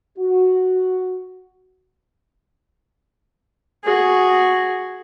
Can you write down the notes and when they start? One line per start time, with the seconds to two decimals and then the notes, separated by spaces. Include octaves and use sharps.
0.18 F#4
3.85 F#4 G#4